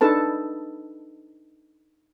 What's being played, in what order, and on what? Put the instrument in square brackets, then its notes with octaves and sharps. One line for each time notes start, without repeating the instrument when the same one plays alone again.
[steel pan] D4 D#4 A4 B4 A5